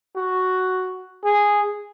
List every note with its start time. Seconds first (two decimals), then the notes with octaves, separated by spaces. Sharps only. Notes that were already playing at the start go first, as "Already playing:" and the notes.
0.16 F#4
1.24 G#4